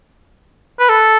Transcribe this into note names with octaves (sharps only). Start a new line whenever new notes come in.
B4
A4